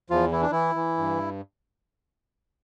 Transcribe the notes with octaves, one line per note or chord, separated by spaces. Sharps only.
E2 F3 F4
E3 E4
D4
E3 E4
E3
G2